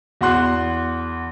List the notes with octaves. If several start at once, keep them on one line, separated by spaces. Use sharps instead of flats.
E2 F#4 F#5 C6 F#6